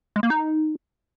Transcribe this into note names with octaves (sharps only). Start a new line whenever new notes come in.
G#3
A#3
D#4